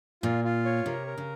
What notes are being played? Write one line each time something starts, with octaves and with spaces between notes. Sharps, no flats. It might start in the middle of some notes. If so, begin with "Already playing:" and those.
A#2 F4
F4
C#5
C3 A#4
A#4
C#3